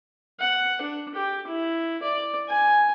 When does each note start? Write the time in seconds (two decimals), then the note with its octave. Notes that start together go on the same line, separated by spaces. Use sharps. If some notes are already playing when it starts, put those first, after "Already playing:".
0.40 F#5
0.81 D4
1.15 G4
1.47 E4
2.03 D5
2.49 G#5